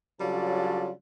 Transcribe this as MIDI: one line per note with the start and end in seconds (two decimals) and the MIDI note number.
0.20 0.91 49
0.20 0.91 54
0.20 0.91 55
0.20 0.91 62
0.20 0.91 65
0.20 0.91 69